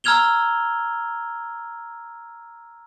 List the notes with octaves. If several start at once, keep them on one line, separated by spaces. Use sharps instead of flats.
A#5 E6 F6 G#6 F7 G7